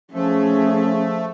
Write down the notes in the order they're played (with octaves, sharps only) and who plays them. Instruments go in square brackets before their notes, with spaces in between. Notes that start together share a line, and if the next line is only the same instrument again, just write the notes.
[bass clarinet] F3 [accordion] A3 [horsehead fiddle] C#4 G#4